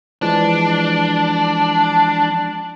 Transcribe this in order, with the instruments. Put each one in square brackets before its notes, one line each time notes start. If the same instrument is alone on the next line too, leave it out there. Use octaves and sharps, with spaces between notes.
[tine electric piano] E3 F3 G#3 [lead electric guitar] D4